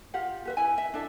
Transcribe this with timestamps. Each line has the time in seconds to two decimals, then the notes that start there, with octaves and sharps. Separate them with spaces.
0.14 F4 G4 F5 F#5
0.45 G4 B4 E5
0.57 E4 G#5
0.78 E5
0.94 D4 E4 A4 E5